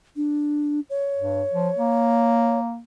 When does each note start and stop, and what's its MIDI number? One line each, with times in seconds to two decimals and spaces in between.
0.16 0.80 62
0.90 2.59 73
1.18 1.42 43
1.53 1.69 53
1.78 2.80 58